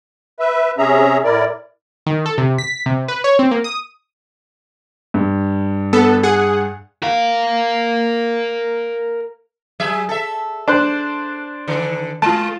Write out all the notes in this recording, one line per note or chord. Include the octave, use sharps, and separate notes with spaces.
B4 E5
C3 C#4 G#4 E5 A#5
A2 E4 A#4 D5
D#3
A4
C3
B6
C3
B4
C#5
C4
A#3
D#6
G2
B3 A4
G#4 F#5
A#4 F5
F#3 G#4 E5
A4 E5
D4 C5 F#6
D3 D#3
G#3 F4 A5